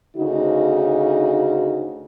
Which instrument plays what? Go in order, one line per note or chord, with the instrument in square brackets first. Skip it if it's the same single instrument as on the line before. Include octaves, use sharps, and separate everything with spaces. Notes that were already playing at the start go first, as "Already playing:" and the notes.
[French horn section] D2 C#3 D#4 F#4